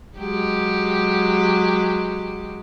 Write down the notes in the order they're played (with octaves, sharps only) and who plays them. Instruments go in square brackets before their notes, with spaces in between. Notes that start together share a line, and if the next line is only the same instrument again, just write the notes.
[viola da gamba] F#3 G#3 G4